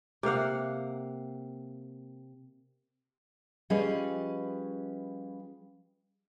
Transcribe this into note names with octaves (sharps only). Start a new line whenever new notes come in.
C3 A#3 F5 F#5
F3 G3 C#4 G#4 B4 D#5